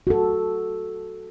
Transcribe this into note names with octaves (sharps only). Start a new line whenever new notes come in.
F#4 A4